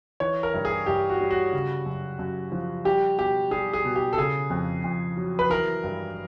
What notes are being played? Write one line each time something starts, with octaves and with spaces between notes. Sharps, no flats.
E3 C#5
A#4
G2
G#4
G2 G4
F#4
G3
F#4
C#3
F#2
F#2
F3
G3 G4
B2 G4
G3 G#4
G#4
B2
G4
A4
C#3 G#4
F2
F2
F#3
B4
E3 A#4
G2